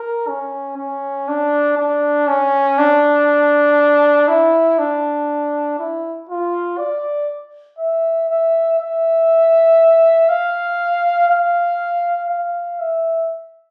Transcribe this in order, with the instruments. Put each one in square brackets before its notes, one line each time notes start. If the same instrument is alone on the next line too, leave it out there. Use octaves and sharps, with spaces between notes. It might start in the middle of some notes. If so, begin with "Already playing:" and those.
Already playing: [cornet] A#4
C#4
C#4
D4
D4
C#4
D4
E4
D4
E4
F4
D5
E5
E5
E5
F5
F5
F5
E5